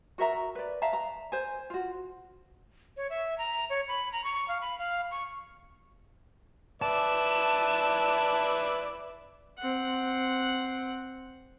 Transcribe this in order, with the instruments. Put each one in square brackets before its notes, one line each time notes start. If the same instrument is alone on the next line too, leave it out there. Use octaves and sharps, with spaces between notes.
[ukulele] F#4 A#4 E5 A#5
B4 D5
E5 F5 A5 A#5
A#5
C5 G#5
F4 F#4
[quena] C#5
E5
A#5
C#5
B5
A#5
C#6
F5
B5
F5
C#6
[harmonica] B4 D5 E5 [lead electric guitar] A5
[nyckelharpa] C4 F#5